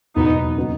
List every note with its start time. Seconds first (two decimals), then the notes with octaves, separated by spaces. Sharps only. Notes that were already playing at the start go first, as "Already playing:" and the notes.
0.16 E2 B2 F#3 A#3 B3 D#4
0.57 C#3 F#3 B3 D#4